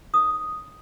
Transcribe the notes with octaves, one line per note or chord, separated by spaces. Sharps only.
D#4 A#4 C#5 D#6